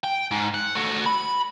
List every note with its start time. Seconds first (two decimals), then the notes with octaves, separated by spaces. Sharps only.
0.04 G5
0.31 G#2
0.54 F#5
0.75 A3 F#4
1.06 B5